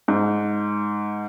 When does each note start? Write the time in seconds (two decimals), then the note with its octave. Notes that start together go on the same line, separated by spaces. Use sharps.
0.08 G#2